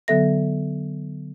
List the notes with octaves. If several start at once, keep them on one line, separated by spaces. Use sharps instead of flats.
D3 F#3 B3 A4 E5 A#6